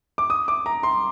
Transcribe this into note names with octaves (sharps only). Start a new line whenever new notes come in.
D6
D#6
D6
A#5
C6